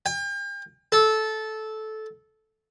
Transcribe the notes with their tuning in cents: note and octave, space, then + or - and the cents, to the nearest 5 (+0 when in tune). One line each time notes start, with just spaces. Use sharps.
G5 +40
A4 -15